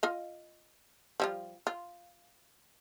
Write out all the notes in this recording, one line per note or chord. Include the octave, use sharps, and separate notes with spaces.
F4 D#5 F5
F3 G3 F4
F4